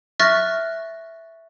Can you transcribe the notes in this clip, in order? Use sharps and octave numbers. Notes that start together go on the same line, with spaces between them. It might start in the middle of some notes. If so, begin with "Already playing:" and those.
E5 C#6 F6 F#6 A6 A#6